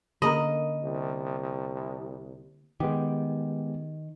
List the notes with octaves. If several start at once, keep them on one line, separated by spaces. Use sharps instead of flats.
D3 A#3 C#4 A#4 D#5 A#5 B5
C2
D#3 G#3 B3 G4